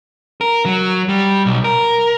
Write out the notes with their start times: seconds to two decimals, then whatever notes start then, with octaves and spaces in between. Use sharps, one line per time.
0.41 A#4
0.66 F#3
1.09 G3
1.46 B1
1.64 A#4